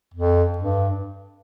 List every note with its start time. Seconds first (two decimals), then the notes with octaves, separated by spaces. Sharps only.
0.14 F2
0.58 G2